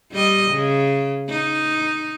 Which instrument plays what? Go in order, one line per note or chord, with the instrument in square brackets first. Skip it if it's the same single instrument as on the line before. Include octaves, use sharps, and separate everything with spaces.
[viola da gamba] G3 D#5
C#3
D#4